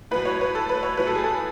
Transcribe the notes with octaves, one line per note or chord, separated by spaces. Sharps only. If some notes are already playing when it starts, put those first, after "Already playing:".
A2 F#3 B4
C#5
B4
A4
B4
C#5
A2 F#3 B4
A4
G#4
A4